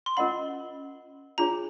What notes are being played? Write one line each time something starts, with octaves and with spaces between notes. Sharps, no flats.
C6
C#4 F4 A#4 D#5 F#5 B5
D4 F4 G#4 C#5 A#5